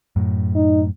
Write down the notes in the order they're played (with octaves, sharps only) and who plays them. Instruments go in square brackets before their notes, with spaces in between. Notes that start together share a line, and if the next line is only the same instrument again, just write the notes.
[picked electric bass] F#2 A2
[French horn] D#4